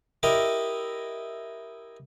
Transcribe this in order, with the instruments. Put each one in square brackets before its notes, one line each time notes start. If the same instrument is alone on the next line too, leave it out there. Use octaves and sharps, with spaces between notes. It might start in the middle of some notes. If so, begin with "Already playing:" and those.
[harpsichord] E4 G4 A#4 D#5 E5